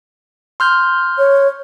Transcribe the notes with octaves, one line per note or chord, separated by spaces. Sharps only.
C6 F6 G6
C#5